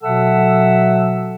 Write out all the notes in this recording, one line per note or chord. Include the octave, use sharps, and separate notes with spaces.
B2 F#3 A4 E5 F#5 E6